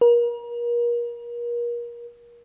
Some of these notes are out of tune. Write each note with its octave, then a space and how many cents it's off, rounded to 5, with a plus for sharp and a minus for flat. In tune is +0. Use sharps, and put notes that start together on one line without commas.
A#4 +35